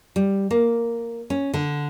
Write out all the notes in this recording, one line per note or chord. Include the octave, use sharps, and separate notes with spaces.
G3
A#3
C#4
D3